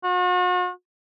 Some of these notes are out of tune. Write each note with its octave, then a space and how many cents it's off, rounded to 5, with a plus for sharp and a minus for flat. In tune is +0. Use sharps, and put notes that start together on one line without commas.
F#4 -45